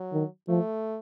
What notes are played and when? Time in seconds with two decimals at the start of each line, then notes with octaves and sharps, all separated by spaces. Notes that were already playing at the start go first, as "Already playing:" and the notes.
Already playing: F#3
0.13 D#3
0.48 F3 A3